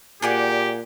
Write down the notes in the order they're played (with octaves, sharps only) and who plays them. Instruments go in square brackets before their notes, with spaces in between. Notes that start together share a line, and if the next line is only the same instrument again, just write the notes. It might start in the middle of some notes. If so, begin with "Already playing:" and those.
[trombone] A#2 [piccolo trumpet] G4 [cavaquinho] G#4 D5 F#5